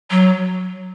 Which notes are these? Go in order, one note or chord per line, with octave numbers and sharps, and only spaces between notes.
F#3